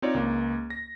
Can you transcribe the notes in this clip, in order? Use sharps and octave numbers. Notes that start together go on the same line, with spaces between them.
C4 D#4 F4 C#5 D5
C#2 A#3
A#6